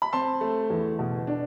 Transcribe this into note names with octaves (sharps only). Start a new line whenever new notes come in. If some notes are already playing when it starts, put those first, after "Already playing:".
B5
C4 A5 C6
A3
E2
B2
D4